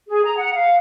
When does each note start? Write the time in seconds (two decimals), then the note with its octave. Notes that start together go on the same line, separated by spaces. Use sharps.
0.08 G#4
0.24 A#5
0.37 F#5
0.54 F5